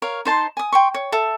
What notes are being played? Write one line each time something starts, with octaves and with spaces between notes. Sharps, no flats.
A#4 C#5 F5
D#4 C5 A5 C6
G#5 D#6
G5 C6 C#6
C#5
A4 E5